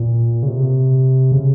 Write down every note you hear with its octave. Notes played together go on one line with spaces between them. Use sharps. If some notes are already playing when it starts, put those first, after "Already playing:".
Already playing: A#2
C#3
C3
C#3